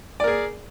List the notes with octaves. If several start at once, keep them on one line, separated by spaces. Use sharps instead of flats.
G#4 A#4 D5